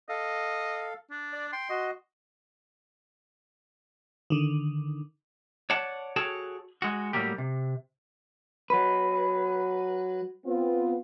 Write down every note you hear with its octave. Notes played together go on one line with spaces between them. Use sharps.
A4 D#5 F5
D4
D5
G5 C6
F#4 D#5
D3 D#3
C#5 D5 F#5 A5
F#4 G#4 A4 C#5 G5 A5
G#3 F#4
A2 F#3 G3 A#3 G4
C3
F#3 B4
B3 C4 F4